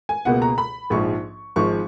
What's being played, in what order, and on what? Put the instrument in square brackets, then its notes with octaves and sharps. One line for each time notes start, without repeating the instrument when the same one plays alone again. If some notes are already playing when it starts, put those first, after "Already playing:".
[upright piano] G#5
C#2 B2 A#3 F#5
A#5
B5
A#1 G#2 F3 C#6
G#1 G#2 F3 G#3 C#6